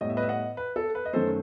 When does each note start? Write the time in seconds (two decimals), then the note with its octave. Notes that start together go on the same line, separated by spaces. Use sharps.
0.01 A2 G3 B3 D#5
0.10 E5
0.17 B4 D#5
0.23 E5
0.29 D#5 F#5
0.57 B4
0.76 A4
0.95 B4
1.05 D#5
1.13 F#2 D#3 A3 A4 C5